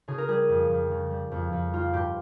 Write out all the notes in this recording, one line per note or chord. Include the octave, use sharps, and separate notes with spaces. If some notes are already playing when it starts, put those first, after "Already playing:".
C#3 G#4
A#4
G3 G#4
F2
F2
C#3
G3
F2
F2
G3 F4
G2 G4